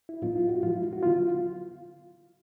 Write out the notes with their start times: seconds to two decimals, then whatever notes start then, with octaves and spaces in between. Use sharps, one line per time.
0.09 E4
0.22 A2 F#3 B3 D#4 F4
0.36 F4
0.49 F#4
0.63 A2 F3 G#3 F4
0.73 E4
0.93 F#4
1.03 D3 F#3 B3 E4 F4
1.16 F4